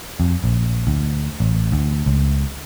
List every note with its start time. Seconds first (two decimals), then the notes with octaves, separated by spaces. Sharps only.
0.20 F2
0.44 A#1
0.87 D2
1.40 A1
1.72 D2
2.06 C#2